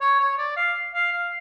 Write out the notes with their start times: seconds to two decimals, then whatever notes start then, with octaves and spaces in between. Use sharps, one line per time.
0.01 C#5
0.20 C#5
0.38 D5
0.57 F5
0.94 F5
1.12 F5